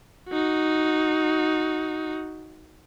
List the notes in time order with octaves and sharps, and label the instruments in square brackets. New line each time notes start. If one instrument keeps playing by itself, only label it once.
[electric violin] D#4 F#4